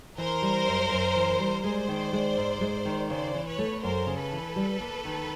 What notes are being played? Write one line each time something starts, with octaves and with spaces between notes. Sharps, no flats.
E3 A#4 C5
G3
F#2
F#2
E3
G3
G#3 C5 D5
D#3
G#3
G#2
G#3
D#3
C#3 C5 D5
E3
B4 C#5
A3
F#2 A#4 C5
C#3
A4 B4
E3
G3
A#3
D#3